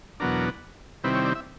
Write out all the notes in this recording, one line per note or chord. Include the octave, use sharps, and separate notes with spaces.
E2 B2 F#3 B3 D4 A#4
C3 D#3 G3 C4 E4 B4
C#5
D5
E5